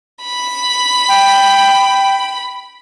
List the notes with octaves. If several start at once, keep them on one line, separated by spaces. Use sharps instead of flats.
B5
G5